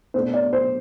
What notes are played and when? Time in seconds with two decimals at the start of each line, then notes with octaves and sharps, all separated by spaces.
0.14 B2 A3 D4 C5
0.34 D5
0.53 C5